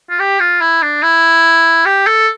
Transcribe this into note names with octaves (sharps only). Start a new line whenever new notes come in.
F4
G4
F4
E4
D4
E4
G4
A4